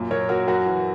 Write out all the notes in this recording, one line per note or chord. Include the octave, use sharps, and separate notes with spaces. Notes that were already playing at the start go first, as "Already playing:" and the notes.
Already playing: F#2 A#2
A#2 A#4 C#5
A#2 F#4 A#4
F#2 F#4 A#4
E3